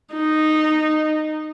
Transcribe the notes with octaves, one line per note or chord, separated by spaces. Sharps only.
D#4